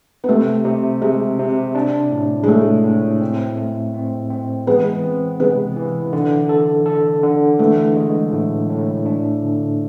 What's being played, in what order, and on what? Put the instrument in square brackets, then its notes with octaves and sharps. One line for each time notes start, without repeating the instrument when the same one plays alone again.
[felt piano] B3
[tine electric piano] C3 [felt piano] A3
[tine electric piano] C3
[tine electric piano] C3 [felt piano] G#3
[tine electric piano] C3
D4
A2
[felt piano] G#3
[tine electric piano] A2 [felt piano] A3
[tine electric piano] A2
C4
A3
C4
C4
[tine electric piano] E3 [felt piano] G#3 B3
[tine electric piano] C4
[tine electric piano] C3 [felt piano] G#3 B3
[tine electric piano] E3
D3
A4
A4
D3
[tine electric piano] E3 [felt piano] A3
[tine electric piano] G#3
A2
A2
D4
D3